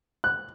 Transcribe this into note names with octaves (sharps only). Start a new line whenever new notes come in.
F#6